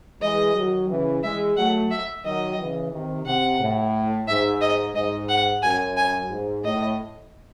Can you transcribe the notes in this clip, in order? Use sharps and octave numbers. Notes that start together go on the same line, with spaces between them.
E3 G#3 D#5
D#3 F#3
C#3 E3
E3 G#3 E5
F#3 A3 F#5
E5
D#3 F#3 D#5
C#3 E3
C3 D#3
C3 F#5
A2
G#2 E5
D#5
G#2 D#5
F#5
F#2 G#5
G#5
G#2
A2 D#5